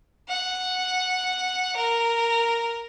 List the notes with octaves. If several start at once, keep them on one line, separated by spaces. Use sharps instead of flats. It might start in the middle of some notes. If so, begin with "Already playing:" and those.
F#5
A#4